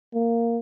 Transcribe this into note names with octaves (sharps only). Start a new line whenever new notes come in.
A#3